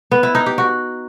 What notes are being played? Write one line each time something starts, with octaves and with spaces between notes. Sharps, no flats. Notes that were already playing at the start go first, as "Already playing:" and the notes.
B3
E4
D#4
G4
F#4